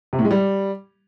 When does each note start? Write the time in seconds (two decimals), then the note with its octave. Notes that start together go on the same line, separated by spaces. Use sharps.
0.13 C3
0.19 A2
0.25 G#3
0.31 G3